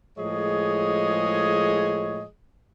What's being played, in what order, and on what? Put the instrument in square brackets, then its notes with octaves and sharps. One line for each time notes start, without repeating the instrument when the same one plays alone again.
[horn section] A2 F3 G#3 G#4 C#5 D#5